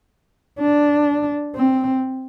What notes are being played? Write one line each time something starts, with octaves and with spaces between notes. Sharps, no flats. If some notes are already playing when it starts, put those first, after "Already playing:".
D4
C4